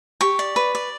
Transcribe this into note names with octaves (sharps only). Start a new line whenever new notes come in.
G4 C#6
D5
B4
D5